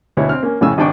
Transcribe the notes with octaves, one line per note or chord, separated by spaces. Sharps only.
D2 B2 E4 C#5
C4 F6
A#3 C#4
F2 A2 C#3 G#5 E6
G#1 D#3 D4 G5 C#6